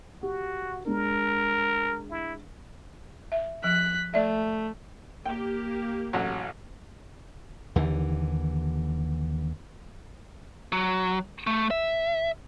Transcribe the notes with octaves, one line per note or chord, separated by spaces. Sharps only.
F#4 G4
G#3 D4 A#4
E4
E5
F3 F#6 B6
A3 D5 E5
A#3 G4 G5
A1 F#3
D#2 D3 E3
F#3
A3
E5